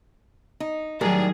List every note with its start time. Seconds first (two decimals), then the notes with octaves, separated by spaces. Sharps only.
0.60 D#4
1.01 A2 D#3 F#3 G3 G#4 A#4